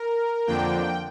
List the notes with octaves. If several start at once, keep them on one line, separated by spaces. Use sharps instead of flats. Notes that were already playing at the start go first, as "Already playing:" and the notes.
Already playing: A#4
F2 D3 F3 A#3 D4 G5